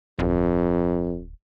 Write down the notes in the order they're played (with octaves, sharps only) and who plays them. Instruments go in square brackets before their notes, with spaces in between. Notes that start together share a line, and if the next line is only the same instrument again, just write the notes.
[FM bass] D1 [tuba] F2